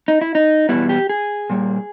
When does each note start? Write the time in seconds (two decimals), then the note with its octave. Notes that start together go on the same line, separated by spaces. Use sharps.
0.08 D#4
0.21 E4
0.35 D#4
0.69 E2 B2 G3 B3 E4
0.89 G4
1.09 G#4
1.50 A#2 G3 A#3